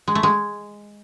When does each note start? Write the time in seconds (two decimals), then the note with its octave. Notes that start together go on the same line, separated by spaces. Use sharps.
0.08 G#3
0.15 A3
0.23 G#3